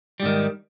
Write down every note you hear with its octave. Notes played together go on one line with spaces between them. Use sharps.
G#2 D#3 G3